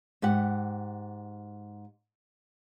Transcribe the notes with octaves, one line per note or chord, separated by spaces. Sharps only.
G#2 G4 F#5